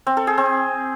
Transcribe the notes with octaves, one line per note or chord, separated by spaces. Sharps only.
C4
A4
G#4
C4